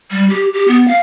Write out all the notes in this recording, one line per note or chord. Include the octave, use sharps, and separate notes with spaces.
G3
G4
G4
B3
F5